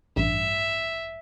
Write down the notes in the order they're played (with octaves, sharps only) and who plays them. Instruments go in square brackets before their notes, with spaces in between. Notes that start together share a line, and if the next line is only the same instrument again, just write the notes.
[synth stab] A1 G2 [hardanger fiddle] E5